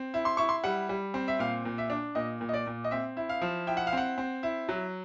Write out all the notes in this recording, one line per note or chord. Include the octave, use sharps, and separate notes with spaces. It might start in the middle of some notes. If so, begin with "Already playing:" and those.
Already playing: C4
E4
C6
E4 C#6
C6
G3 F#5
G3
C4
E5
A#2 F5
A#2
E5
D4
A#2 D#5
A#2
D#5
D5
A#2
D#5
C4 E5
E4
F5
F3
E4 G5
F#5
F5
C4 F#5
C4
E4
F#3